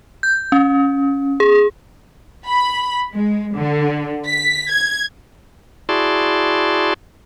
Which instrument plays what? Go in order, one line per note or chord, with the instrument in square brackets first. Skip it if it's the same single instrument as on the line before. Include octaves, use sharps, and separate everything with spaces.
[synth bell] G6
C#4
G#4
[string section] B5
G#3
D3
B6
G#6
[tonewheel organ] E4 F#4 G#4 D5 A5 C6